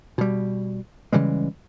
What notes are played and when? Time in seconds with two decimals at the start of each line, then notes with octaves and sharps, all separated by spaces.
0.18 B2 G3
1.13 C#3 E3 G3 G#3